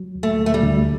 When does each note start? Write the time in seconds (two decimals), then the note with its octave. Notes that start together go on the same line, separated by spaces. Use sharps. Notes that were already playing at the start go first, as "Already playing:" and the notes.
Already playing: F#3
0.15 D2
0.23 A3
0.38 D2
0.46 A3
0.54 G3
0.62 D2